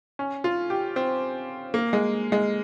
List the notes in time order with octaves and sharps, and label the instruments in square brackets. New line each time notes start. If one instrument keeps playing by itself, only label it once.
[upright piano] C#4
F4
G4
C4
A#3
G#3
G#3